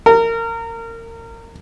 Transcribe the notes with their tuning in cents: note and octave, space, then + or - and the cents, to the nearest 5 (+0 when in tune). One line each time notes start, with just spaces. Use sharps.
A#4 -25